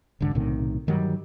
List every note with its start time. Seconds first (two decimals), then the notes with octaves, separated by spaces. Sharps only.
0.21 E1 G#2 D3
0.35 B1 A2 C3 D#3
0.87 G2 D#3 F#3 G3